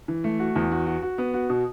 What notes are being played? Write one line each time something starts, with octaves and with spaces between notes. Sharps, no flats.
E3
A3
F#4
E2
F#4
F#4
F#4
B3
F#4
B2